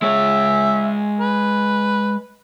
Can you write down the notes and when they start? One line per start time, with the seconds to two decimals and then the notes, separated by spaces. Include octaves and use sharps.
0.02 G#3 C#5 E5
1.20 B4